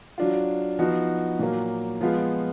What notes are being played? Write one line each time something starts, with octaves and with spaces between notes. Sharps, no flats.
F#3 D4 F4
F3 B3 D#4 F#4
A#2 F#3 A#3
F3 G#3 B3 F4